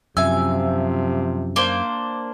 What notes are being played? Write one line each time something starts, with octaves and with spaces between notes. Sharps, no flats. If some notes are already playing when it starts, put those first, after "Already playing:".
F#2 C3 F3 E5 G#5 E6
A#3 D4 C5